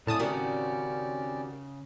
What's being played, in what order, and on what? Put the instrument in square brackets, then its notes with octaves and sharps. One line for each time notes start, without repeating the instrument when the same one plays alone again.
[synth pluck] A2 A5 D#6 [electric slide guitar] C#3 [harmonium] C4 C#4 D5
[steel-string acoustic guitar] D#3 G3 F#4